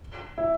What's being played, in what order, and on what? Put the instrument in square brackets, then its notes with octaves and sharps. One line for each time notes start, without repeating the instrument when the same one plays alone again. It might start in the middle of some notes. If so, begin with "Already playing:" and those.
[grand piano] E4